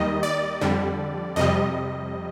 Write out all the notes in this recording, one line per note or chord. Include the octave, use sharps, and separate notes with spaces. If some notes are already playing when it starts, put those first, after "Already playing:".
Already playing: D#2 D#3 G3 D#5
D5
F2 D3 G3
F2 C3 G3 D#5